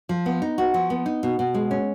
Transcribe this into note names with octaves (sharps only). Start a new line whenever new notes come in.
F3
B3
D#4
F#4
F3
B3
D#4
B2
B2
G#3
C#4